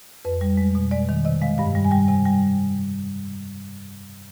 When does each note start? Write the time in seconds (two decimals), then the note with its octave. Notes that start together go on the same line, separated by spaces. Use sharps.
0.25 F2 B4
0.41 G3
0.57 G#3
0.75 B2
0.91 G#3 D5
1.09 D#3
1.25 C3 D#5
1.42 G#3 F5
1.58 G2 F5
1.75 G3
1.85 G#5
1.91 G3 G5
2.08 C3 G#5
2.25 G3 G5